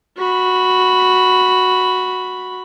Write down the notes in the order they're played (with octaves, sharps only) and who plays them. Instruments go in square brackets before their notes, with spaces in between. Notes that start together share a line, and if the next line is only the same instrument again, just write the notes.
[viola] F#4 B5